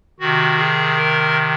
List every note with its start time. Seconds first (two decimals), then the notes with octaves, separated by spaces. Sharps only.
0.20 C3 D#3 F#4
0.58 G#4
0.97 A#4